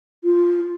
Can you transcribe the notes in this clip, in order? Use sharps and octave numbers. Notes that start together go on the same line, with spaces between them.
F4